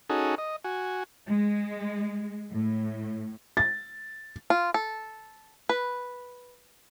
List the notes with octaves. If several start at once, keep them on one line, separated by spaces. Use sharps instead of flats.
C#4 D#4 F#4 G#4 A4
D#5
F#4 G#5
G#3
A2
A6
F4
A4
B4